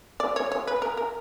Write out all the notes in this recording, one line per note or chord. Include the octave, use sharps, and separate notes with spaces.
D5
C#5
C#5
B4
A#4
A#4